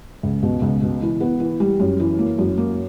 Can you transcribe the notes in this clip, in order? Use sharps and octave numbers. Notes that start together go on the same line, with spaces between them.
C#2
B2
C#2
B2
E3
B3
E3
G3
F#2
E3
A#3
F#2
A#3